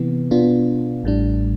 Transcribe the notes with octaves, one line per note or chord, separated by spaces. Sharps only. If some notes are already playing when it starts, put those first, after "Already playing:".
Already playing: C3 E3 B3
B2 B3 D4 F4
A1 A2 G3 D4